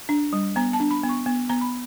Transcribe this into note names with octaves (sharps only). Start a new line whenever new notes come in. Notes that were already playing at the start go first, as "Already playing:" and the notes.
D4
G3
B3 A#5
A5
D4
B5
B3
C#6
B3
B3 A#5
B5